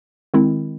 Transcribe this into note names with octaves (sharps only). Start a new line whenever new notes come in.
D#3 G#3 C4 E4